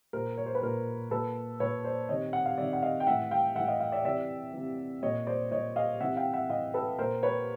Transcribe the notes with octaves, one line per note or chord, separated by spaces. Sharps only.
A#2 A#4 C5
C#5
C5
B4
A#2 A#4 C5
A#2 A4 B4
A#2 B4 C#5
C5 D5
C3 D#3 C#5 D#5
F#5
F5
C3 D#3 D5 E5
F#5
D#5 F5
G5
A2 E3 E5 F#5
F5 G5
A2 E3 E5 F#5
D#5 F5
D#5 F5
D5 E5
C3 E3 D5 E5
C3 E3
A#2 C#5 D#5
C5 D5
A#2 C#5 D#5
D#5 F5
C3 E3 E5 F#5
F5 G5
E5 F#5
C3 E3 D#5 F5
A4 B4
A#2 A#4 C5
B4 C#5